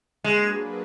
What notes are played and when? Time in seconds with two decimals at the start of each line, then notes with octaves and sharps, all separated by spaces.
0.24 F#3 G#3 A#3 D4 G#4 B4